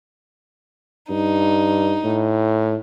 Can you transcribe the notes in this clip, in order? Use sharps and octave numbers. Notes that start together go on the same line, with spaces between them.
G2 D#4
A2